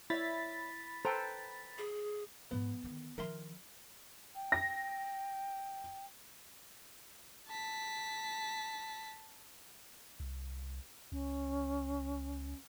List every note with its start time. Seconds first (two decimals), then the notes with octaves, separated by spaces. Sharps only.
0.10 E4 C#5 D5 E5 B5 A6 B6
1.05 A4 B4 C5 G5 A#5
1.78 G#4
2.51 G#2 F3 B3
2.84 D3 D#3
3.18 D#3 F3 A#4 E5 C6
4.35 G5
4.52 A#6
7.47 A5 B6
10.20 C2
11.12 C#2 C#4